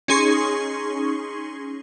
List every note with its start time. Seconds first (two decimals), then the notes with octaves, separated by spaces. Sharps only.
0.08 C#4 D#4 G#4 C6 C#6